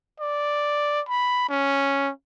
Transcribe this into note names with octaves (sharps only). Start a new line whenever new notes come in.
D5
B5
C#4